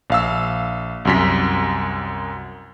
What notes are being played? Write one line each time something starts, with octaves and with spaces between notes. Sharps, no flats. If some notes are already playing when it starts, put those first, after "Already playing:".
A#1 F5 E6
C2 F#2 B6